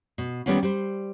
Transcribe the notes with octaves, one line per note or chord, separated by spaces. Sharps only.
B2
D#3 E3 G3 B3 C#4 F4
G3 C5